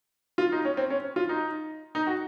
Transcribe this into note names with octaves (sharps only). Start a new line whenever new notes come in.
F4
D#4
C#4
C4
C#4
F4
D#4
D#4
F#4